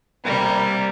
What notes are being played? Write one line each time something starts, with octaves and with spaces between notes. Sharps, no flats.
C3 G3 A#3